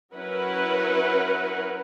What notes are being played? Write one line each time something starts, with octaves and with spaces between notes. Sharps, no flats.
F#3 C#4 E4 A#4 B4 F#5